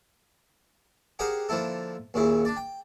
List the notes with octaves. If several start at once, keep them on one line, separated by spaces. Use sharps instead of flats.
G4 G#4 A#4 C5 F5 F#5
D3 F3 A#3 E4 A4
D#2 A#2 C#3 E4
D4 D5
G5